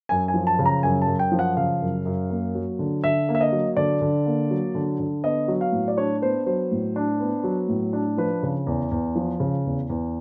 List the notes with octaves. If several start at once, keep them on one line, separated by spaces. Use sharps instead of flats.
F#2 G#5
G#5
F3
A5
C#3
A#5
F#2 G#5
A5
F#2
G5
F3
F#5
C#3 F5
F#2
F#2
A#3
F#3
D3
D3 E5
A#3
E5
D#5
F#3
D3 D5
D3
A#3
F#3
D3
D3
B3 D#5
F#3
F5
A2
D5
D4 C#5
B3 C5
F#3 C5
A2
D4
B3
F#3
A2
D4
F3 B4
C#3
E2
E2
F3
C#3
E2
E2